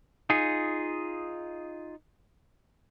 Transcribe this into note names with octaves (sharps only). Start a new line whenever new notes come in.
D#4 F4 G#4